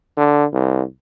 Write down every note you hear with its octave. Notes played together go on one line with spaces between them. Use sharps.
D3
C2